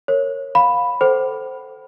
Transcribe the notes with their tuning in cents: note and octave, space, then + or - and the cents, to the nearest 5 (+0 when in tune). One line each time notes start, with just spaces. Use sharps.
A#4 -15 C#5 -10
F5 +25 B5 +0
A4 +0 C5 +0 F#5 +45